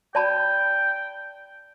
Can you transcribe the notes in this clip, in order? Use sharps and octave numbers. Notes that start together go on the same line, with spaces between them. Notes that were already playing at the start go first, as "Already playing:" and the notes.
D5 G5 A5 B5